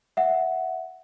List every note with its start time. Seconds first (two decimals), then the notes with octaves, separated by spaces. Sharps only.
0.17 E5 F#5